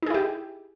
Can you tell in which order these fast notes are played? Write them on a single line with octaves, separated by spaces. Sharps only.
D#4 G#4 E4 G4